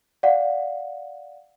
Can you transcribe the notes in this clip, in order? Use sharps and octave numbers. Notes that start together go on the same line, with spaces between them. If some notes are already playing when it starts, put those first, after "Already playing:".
D5 F5 F#5